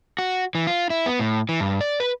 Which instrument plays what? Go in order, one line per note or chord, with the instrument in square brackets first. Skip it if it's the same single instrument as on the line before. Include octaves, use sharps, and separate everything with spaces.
[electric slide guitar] F#4
E3
F4
E4
B3
A2
E3
G2
D5
B4